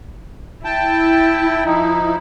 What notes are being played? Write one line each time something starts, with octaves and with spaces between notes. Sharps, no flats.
E4 G5 A5
F3 D#4